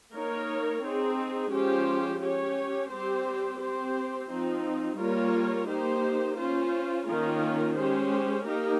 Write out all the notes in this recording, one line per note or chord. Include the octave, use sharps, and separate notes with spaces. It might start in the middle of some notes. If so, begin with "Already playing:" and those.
A#3 D#4 A#4 C#5
C4 D#4 G#4
F3 G#3 C#4 G4 C5
C#4 G4 C#5
G3 C4 G4 C5
C4 G4 C5
F3 C4 D#4
G3 A#3 F4 A#4 C#5
A#3 D#4 G4 C5
C#4 F4 C5
D#3 A#3 C#4 F4 A#4
G#3 C#4 G4 C5
A#3 D#4 G4 A#4